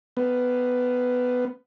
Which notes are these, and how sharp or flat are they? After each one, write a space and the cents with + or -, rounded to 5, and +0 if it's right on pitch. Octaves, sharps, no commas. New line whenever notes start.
B3 +10